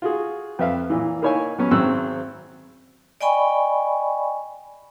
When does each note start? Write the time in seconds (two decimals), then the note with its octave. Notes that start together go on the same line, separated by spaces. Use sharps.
0.02 F4 F#4 G#4
0.59 F2 B4 E5 F5
0.90 A#2 E3
1.22 A#3 D#4 E4 C#5 F5 G#5
1.58 F#3 B3 C#4
1.71 G#1 F#3 C4 E6 F#6
3.21 D5 D#5 G5 G#5 B5 C#6